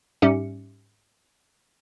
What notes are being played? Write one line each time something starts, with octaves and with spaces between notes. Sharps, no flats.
G#2 G3 C#4 G4 E5 C#7